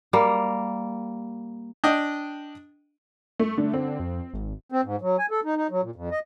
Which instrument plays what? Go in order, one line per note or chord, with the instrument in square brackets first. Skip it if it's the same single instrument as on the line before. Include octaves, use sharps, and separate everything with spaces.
[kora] G3 A#3
[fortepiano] D4 D#5 G5
[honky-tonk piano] A3
[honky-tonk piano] D3 [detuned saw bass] A3
[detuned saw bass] D3 [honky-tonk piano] C4
[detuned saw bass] F2
G#1
[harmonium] C4
G#2
F#3
G#5
A4
D#4
D#4
F#3
A#2
F2
D#5